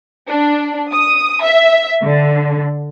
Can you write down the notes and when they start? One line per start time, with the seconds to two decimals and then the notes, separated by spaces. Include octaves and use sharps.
0.29 D4
0.91 D#6
1.43 E5
2.04 D3